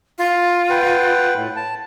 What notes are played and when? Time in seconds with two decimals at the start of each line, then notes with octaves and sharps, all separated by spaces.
0.18 F4
0.70 B4 F#5 G5
1.35 A2
1.56 A5